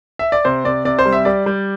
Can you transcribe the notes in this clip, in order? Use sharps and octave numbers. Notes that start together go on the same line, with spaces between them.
E5
D5
C3 C5
C3 D5
C3 D5
C5
G3
E5
G3 D5
G3